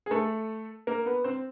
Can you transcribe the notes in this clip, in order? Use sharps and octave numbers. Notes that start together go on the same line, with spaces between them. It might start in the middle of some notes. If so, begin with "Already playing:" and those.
G#4
A3 A4
A#3 A#4
B3 B4
C4 C5